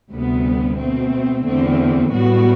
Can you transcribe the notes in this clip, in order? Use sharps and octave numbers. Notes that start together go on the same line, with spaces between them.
D2 C3 G3 B3
B2 A3 C4
E2 D3 A3 C4
A2 G3 B3 F#4